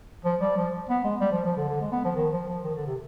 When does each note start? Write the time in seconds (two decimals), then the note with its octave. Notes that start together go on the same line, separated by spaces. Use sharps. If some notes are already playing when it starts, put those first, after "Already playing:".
0.25 F3
0.41 G3
0.57 F3
0.90 B3
1.04 G#3
1.20 G3
1.32 F3
1.45 F3
1.57 D3
1.68 D3
1.81 G#3
1.92 B3
2.05 F3
2.16 D#3
2.32 F3
2.48 F3
2.64 D#3
2.76 D3
2.87 C3